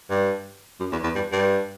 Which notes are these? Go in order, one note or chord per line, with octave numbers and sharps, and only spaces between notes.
G2
F#2
E2
E2
G2
G2